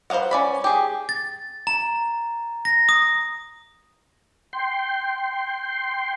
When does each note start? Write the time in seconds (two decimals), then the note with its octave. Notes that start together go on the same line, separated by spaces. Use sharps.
0.10 B4 C5 D#5 F5 F#5
0.31 C#4 D5 B5
0.64 G4 G#4
1.09 A6
1.67 A#5
2.65 A#6
2.89 D#6
4.53 G5 C6